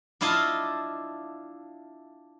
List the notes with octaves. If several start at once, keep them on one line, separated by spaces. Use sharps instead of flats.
D4 E4 F4 D#5 F5 A5